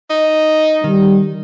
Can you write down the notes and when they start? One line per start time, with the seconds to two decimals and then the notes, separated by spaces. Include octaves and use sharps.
0.10 D#4
0.84 D#3 G3